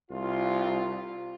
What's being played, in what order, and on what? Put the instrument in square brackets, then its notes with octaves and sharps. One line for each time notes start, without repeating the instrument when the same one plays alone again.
[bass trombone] C2 [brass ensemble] F4